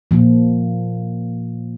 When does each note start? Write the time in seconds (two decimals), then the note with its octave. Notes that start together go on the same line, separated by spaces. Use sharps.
0.11 A#2 F3